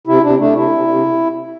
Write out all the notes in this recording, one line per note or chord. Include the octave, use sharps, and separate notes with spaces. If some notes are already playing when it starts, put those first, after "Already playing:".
C3 E4
C3 D4
A3 D4
C3 E4
C3
C3